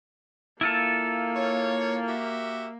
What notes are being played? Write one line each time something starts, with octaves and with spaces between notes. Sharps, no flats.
A#3 E4 F4 A4
C#5
F#4 G4 E5